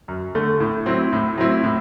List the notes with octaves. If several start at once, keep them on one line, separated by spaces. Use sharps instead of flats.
F#2
D3 A3
A2
F#3 C4 E4
A2
F#3 C4 E4
A2